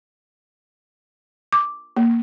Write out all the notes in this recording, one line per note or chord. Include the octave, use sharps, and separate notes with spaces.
D6
A#3